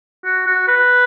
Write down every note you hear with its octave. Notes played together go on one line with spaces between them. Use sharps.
F#4
F#4
B4